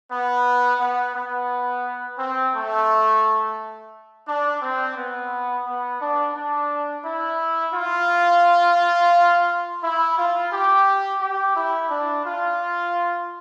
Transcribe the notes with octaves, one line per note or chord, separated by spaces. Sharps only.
B3
B3
B3
C4
A3
D4
C4
B3
B3
D4
D4
E4
F4
E4
F4
G4
G4
E4
D4
F4